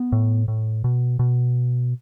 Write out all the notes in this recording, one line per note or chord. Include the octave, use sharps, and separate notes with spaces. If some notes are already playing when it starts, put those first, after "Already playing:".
Already playing: B3
A2
A2
B2
B2